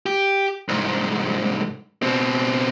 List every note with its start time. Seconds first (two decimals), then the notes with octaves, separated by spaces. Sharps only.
0.06 G4
0.69 C2 G#2
2.02 B2 C4